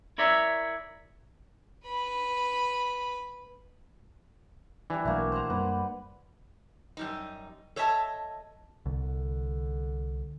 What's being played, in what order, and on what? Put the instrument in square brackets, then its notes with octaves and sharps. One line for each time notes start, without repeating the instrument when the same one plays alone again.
[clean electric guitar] E4 A#4 C#5 D5 E5
[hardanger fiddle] B4 B5
[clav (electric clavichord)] E3 [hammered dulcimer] G3 D4
[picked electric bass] B1 [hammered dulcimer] A3 A#3 F#4
[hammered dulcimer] C5 F#5 A#5
[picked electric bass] F#2 G3 A#3 [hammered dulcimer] B4
[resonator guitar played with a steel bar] F#2 G3 D#4
A4 C#5 D#5 E5 A5
[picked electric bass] C2 [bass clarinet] D3